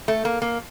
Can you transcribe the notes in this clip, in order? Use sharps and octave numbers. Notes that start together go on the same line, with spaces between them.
A3
A#3
A#3